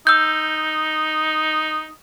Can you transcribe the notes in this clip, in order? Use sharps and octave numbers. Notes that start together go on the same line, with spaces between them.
D#4 E6 G6